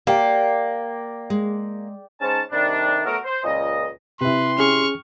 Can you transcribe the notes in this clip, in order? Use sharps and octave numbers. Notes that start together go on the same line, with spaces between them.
A#3 G4 D5 G5
G#3
G#2 C#4 A5
C3 D#3 G3 A3 D4
F#3 A3 B3 F#4 A4 A#4
C5
C#2 A#2 D#5
C3 E4 B4 C6
C#4 G#4 C#6 F6